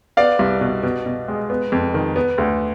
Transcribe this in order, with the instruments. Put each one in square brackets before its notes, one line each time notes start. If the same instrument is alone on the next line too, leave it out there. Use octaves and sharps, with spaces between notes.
[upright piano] B3 D5 F5
C2
B2
B2
B2
G#3
B3
F2
D#3
B3
D2